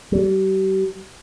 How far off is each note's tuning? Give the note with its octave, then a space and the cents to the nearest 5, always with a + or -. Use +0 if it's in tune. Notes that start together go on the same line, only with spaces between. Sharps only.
G3 -40